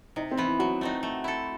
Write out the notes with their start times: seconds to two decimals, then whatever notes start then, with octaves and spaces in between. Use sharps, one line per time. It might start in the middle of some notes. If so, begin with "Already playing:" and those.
0.16 C3 D#4
0.31 C4
0.37 E3 B3
0.45 E4
0.59 F#3 F#4
0.81 A3 C4 D#4
1.03 A3
1.24 E4 A4